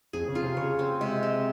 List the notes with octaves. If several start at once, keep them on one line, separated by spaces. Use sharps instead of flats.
F2 G#4
C#3
F4
C3
C#3 C#5
C4
C3 G#3
C4